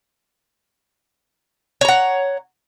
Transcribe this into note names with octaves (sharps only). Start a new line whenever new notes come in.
C#5 F#5 A#5